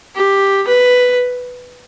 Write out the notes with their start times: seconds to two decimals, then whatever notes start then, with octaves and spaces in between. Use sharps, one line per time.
0.16 G4
0.68 B4